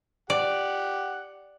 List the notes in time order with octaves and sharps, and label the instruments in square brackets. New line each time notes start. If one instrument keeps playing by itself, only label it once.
[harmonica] G4 F#5 [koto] D5